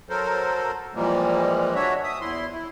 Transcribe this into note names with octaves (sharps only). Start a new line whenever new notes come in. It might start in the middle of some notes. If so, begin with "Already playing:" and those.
F#3 A4 A#4 C5
A#2 E3 F3 G3 G#3 A#3
D4 F#4 C#5 E5
E5 D#6
E2 E4 C6
E4